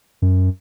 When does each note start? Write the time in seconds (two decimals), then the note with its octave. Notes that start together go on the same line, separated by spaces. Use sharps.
0.22 F#2